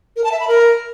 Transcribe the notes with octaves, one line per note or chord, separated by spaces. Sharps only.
A#4
A5
E5
B5
A#4